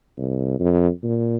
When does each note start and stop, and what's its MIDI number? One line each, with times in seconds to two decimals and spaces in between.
0.18 0.56 36
0.60 0.88 41
1.03 1.38 46